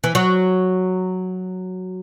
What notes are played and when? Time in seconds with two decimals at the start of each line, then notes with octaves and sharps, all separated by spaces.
0.04 E3
0.15 F#3